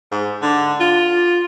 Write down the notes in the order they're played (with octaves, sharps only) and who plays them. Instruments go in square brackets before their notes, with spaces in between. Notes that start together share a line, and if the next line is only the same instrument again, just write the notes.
[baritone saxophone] G#2
D3
F4